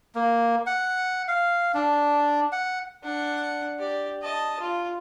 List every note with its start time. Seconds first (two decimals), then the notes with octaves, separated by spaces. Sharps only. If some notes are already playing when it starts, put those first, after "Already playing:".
0.15 A#3
0.67 F#5
1.28 F5
1.74 D4
2.52 F#5
3.03 D4 F#5
3.79 G4 D5
4.22 D#5 A5
4.60 F4